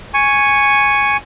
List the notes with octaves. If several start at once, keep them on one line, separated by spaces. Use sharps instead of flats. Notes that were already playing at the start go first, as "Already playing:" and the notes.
G#5 C#6